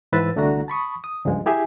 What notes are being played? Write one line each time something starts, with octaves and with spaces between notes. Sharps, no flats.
G#2 E3 B4 C5 E6 A6
C2 D3 A3 D4 F#4 A#5
A5 B5 C#6 D#6
D#6
C#2 G2 F3 G#3
E4 G4 G#4 E5 G#5